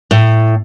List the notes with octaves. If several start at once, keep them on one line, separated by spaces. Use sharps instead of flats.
A2